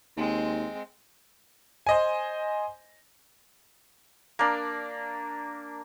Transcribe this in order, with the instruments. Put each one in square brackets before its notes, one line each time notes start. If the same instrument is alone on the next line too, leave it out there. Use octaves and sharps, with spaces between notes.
[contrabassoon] D#2 [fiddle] G#3 C4
[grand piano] C5 D#5 G#5
[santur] A#3 D4